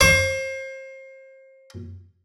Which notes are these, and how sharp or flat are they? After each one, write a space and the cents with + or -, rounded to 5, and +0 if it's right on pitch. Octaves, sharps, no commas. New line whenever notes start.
C5 +30 C#6 +20